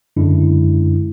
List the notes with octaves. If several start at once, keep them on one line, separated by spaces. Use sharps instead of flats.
F#2 D3 G#3 D4 E4